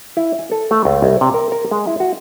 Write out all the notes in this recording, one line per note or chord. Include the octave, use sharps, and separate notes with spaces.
E4
G#5
A4
A3
C#2
C2
C3
A#4
A#4
G#3
E4
F#4